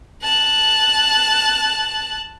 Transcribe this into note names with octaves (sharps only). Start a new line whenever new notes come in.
A5 F#6